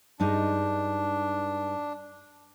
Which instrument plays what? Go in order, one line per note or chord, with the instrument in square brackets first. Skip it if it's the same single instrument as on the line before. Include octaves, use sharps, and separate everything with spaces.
[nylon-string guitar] G2 G#3 D#4 [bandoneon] D4